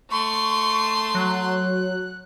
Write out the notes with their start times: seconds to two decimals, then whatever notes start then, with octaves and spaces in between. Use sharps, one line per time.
0.10 A3 C6 C#6
1.14 F#3 F#6